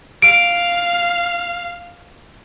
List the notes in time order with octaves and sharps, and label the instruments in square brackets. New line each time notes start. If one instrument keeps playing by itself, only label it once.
[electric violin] F5 [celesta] D7